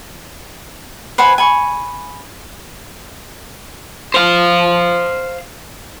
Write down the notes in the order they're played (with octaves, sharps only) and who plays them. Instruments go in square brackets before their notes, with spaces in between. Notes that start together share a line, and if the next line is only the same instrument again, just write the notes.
[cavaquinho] B4 C5 F#5 G#5
G#5 B5 C#6
[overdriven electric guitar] C5 F5